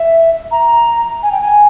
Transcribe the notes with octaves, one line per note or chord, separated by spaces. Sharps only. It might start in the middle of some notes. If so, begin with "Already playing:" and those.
Already playing: E5
A#5
G#5
G5
G#5